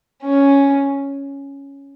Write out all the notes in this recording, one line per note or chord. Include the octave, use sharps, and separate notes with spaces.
C#4